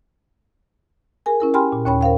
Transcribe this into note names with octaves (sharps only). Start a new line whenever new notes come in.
G#4 A#4 G#5
C#4 E4 A#4
G4 G5 G#5 B5 C6 F6
A#2
D#2 C#4 C#5 G5 B5
A#4 C5 F5 G5